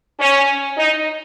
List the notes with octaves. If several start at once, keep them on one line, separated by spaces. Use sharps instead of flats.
C#4
D#4